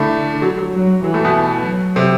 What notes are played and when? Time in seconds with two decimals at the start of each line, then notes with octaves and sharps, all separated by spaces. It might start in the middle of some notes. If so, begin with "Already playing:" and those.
Already playing: A2 D3 A3
0.42 F#3
0.58 F#3
0.73 F#3
1.04 E3 F#3
1.14 A2 A3
1.25 B2 B3
1.65 F#3
1.96 C3 C4